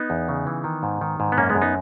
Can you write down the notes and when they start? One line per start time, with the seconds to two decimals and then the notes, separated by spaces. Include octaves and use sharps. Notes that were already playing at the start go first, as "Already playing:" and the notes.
Already playing: B3 D#4
0.10 E2
0.29 C#3
0.47 E3
0.64 D#3
0.83 G#2
1.01 D#3
1.20 G#2
1.32 B3
1.38 F#2 A#3 C#4
1.50 G#3 B3
1.55 F#2
1.61 B3 D#4